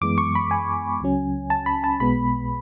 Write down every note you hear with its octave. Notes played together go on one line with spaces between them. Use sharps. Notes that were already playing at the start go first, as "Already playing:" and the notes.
F#2 E3 G#3 B3 D6
C#6
B5
G#5
C#2 C#3 F#3 C#4
A5
B5
A5
B1 B2 G#3 B3 B5